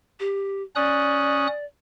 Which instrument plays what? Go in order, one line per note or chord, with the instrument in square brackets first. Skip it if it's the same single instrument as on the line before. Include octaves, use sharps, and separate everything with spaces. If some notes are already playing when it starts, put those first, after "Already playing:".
[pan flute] G4
[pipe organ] C#4 D#6 F#6 [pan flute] D5